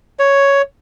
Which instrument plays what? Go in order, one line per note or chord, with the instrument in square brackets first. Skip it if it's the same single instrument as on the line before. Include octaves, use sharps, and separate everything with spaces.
[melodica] C#5